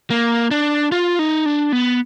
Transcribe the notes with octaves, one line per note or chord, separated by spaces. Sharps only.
A#3
D4
F4
D#4
D4
B3